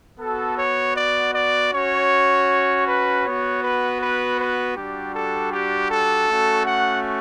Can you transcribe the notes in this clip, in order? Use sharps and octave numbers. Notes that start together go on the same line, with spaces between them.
B3 F#4 A4
C#5
D5
D5
C#4 F#4 C#5
B4
B3 F#4 C#5
B4
B4
B4
G3 D4 F#4 G4
A4
G4
A4
A3 C#4 F#4
F#5